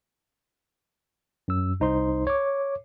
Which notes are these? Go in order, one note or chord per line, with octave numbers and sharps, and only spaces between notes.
F#2 E6
C2 D#4 C5 C6
C#5 D6